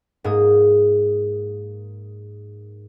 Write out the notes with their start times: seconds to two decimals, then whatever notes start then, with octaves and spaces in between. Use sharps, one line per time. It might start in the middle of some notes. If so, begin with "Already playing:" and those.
0.24 G#2 A#3 D#6